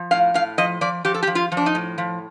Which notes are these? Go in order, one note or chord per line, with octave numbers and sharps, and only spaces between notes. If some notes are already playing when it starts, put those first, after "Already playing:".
Already playing: F3
A2 F5
A2 F5
F3 D#5
F3 D5
F3 G4
A4
G4
F3
F4
F3
D4
D#4
A2
F3